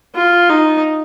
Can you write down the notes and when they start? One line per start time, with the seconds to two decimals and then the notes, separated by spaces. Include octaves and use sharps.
0.15 F4
0.49 D#4